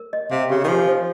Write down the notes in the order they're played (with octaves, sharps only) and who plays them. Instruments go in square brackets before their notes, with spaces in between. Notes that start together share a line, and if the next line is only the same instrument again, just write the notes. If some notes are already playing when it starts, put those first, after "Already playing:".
Already playing: [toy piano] A#4
D#5
[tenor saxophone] C3 [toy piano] F5
[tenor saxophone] C#3 [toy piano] G4
[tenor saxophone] D#3
[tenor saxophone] F3 [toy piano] G#5
[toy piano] C5